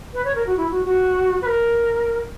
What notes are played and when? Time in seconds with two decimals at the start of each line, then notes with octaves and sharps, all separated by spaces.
0.14 B4
0.25 C#5
0.35 A#4
0.47 F#4
0.57 E4
0.71 F#4
0.85 F#4
1.42 B4
1.46 A#4